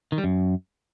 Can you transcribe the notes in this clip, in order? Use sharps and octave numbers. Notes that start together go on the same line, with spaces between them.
D#3
G3
F#2